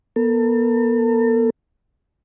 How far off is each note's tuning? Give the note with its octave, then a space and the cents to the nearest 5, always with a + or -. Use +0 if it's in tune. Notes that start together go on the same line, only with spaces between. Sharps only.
B3 -40 A4 +40